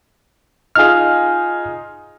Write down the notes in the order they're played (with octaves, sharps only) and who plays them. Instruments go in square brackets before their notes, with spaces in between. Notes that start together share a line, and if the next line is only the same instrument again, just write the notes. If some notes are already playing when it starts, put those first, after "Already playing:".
[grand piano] D#4 F4 G#4 [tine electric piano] F6